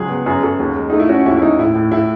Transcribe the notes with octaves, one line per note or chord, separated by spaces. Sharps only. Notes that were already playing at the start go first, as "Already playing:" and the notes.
Already playing: C#2 F#3 G#4
B3
F#2 G#4
F#2 A4
D#2
G#3
A3 D#4
E4
C#4 F#4
D#2 E4
E4
D#2 D#4
A2 E4
A2
A2 E4